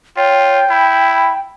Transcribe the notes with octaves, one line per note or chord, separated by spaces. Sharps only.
F4 C#5 G5
E4 B5